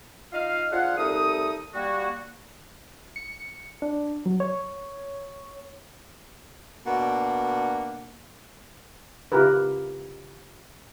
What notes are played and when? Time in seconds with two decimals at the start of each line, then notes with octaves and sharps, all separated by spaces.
0.33 D#4 F4 D#5 F5
0.70 D4 F4 G#4 C5 F5 F#5
0.98 C2 A3 D#4 D#6
1.74 G3 A#3 F#4
3.16 C#7
3.82 D4
4.26 F#3
4.40 C#5
6.85 B2 A#3 D4 F#5
9.32 C#3 E4 F4 G4 A#4 B4